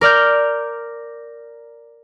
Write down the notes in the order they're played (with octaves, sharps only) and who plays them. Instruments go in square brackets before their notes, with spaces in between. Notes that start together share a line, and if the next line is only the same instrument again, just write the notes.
[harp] A#4 D5 F6 G6